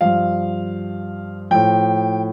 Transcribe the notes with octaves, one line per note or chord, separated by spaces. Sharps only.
G2 F3 F5
A2 F3 G5